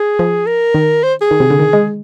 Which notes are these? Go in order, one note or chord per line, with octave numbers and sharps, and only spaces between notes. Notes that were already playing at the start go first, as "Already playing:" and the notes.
Already playing: G#4
F3
A#4
D#3
C5
G#4
D#3
C3
D3
D#3
G#3